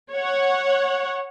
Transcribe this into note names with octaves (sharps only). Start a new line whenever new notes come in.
C#5 F#5